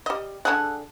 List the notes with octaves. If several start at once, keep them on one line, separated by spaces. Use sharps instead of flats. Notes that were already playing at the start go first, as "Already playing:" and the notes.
G3 D#5
D3 G#4 A4 F#5